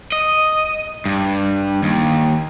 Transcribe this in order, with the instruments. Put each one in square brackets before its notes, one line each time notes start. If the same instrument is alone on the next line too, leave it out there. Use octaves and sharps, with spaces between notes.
[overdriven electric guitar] D#5
G2
D#2